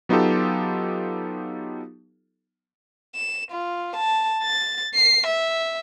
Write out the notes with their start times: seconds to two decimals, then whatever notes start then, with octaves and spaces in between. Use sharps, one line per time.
0.09 F#3 B3 D#4 F4 G4 A4
3.15 E7
3.52 F4
3.97 A5
4.42 A6
4.95 C7
5.27 E5